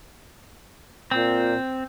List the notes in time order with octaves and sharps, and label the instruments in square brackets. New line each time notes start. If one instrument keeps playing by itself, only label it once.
[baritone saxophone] A#2 [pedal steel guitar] C4